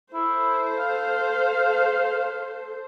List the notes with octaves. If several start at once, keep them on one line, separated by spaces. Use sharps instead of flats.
E4 A4 C5
F5